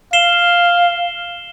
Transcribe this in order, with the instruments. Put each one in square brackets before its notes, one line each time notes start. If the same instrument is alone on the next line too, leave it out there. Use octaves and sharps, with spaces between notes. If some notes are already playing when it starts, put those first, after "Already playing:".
[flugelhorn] F5 [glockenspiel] C7 E7 G7